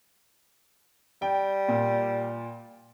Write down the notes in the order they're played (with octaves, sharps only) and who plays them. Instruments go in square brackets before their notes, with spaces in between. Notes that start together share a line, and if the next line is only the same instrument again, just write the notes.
[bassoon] G3 [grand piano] G5
[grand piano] A#2